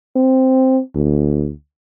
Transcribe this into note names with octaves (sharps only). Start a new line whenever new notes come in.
C4
D2